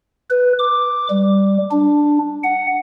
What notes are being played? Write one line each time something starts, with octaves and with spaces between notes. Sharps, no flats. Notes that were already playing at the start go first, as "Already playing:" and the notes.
B4
D6
G3
D4
F#5